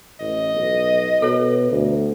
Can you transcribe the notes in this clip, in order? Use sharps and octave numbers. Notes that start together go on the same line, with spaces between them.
A1 D#5
B1
B2 A4 C#5
D2